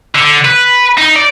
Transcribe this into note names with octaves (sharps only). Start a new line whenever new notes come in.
D3
B4
D#4
D5